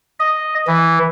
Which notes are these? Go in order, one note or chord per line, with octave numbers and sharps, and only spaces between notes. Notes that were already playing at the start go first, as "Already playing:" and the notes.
D#5
E3